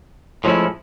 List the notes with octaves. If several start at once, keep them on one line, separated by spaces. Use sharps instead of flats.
A2 F3 G#3 C#4 E4